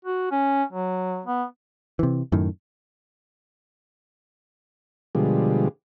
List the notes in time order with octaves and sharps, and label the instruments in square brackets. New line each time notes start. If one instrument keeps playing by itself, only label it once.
[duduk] F#4
C#4
F#3
B3
[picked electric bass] C3 E3
F#2 A2 D#3
[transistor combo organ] B2 D3 F3 G3 G#3